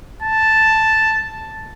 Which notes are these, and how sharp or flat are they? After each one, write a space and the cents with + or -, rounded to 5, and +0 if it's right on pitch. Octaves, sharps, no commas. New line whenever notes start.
A5 +0